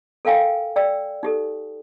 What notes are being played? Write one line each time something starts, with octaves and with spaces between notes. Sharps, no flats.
A4 A#4 F5 G5 G#5
D5 G5 E6
D#4 G4 A4